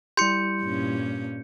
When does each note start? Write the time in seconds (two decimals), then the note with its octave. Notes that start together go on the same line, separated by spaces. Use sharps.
0.17 G3 E4 G4 C6 G6 C#7
0.62 G2 A#2 C#4